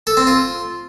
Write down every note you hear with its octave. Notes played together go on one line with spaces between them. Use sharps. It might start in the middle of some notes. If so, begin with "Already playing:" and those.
A4
C4
F4